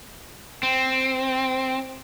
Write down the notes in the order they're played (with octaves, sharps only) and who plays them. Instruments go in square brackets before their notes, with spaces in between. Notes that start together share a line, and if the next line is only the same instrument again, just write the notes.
[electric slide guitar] C4